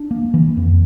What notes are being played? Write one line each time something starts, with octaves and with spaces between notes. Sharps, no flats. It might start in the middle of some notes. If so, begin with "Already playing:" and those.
Already playing: D4
A#3
E3
F2